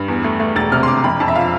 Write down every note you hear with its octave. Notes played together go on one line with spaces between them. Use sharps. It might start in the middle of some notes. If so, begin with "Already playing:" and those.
Already playing: G2
E2
A3
A3
E1 A6
C3 F6
C6
E1 D6
F2 B5
F2 A5
E5
F3 F5